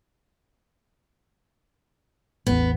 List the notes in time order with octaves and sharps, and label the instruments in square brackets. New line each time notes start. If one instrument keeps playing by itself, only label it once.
[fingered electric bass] A1 E2 [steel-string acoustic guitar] B3